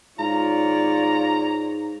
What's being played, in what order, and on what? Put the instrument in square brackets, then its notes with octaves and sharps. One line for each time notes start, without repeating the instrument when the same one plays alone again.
[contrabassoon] G#2 [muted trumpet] F4 [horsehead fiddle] C#5 D5 [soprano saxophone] A#5